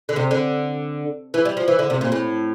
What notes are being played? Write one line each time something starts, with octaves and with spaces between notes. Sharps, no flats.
D3
C3
D3
E3
G3
F3
E3
D3
C3
A#2
A2